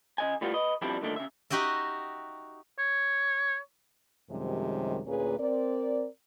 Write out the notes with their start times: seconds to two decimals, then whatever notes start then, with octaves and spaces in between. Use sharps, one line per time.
0.18 C#3 D#5 G#5
0.41 A2 G3 B3 F4
0.54 B4 D#5
0.82 F2 B2 F3 G3 D4 E4
1.01 G2 A#2 D3 D#3 A3
1.16 C#3 E5
1.50 D#4 F#4 G4 D#5 E5
2.79 C#5
4.30 F#2 C3 D#3 F3 G3 G#3
5.06 D2 A#2 A#3 C#4 G#4 B4
5.38 C4 A#4 D5